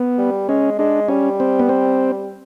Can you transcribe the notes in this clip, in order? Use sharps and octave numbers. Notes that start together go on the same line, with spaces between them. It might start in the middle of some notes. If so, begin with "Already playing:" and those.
Already playing: B3
G3
G#3 C#4
G#3 D4
G3 C#4
C4
B3
C4